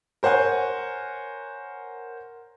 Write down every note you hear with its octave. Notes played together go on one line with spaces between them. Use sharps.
A#4 C5 C#5 F#5 G#5